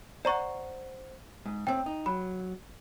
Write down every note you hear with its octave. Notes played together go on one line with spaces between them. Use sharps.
C5 D5 F#5 A#5 C#6
G#2
A2 C4 G5
D#4
F#3 B5